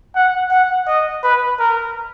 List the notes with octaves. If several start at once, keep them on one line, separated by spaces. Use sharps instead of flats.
F#5
F#5
D#5
B4
A#4